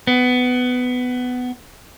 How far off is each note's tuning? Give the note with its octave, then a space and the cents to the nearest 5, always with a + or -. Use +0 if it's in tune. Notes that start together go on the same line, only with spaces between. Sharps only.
B3 +15